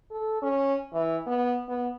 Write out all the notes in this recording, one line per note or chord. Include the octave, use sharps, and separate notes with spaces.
A4
C#4
E3
B3
B3